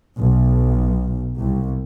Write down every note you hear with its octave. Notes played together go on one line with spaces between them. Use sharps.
B1
C2